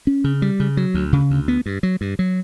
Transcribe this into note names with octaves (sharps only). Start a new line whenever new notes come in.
C#4
C#3
G3
C#3
F#3
D2
C#3
D2
B3
G2
F#3
G2
F#3